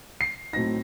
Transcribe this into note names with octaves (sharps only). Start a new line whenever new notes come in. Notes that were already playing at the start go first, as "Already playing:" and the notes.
C7
A2 F#3 C4 D#4 A#6